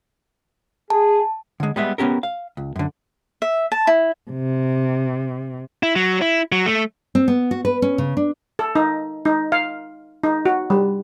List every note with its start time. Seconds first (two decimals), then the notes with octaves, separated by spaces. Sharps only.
0.90 G#4 A5
1.60 D3 G#3
1.76 G3 G#3 B3 E5
1.98 B3 C#4 G4 A#4
2.23 F5
2.57 C#2
2.76 F#2 D3
3.42 E5
3.72 A5
3.87 E4
4.31 C3
5.83 E4
5.96 F#3
6.22 E4
6.52 F#3
6.66 A3
7.15 C4
7.28 B3
7.51 F#4
7.65 B4
7.82 C#4
7.98 C#3
8.17 D4
8.59 A4
8.75 D#4
9.25 D#4
9.52 F5
10.24 D#4
10.46 F#4
10.70 G3